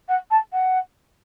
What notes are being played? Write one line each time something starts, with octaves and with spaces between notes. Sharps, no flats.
F#5
A5
F#5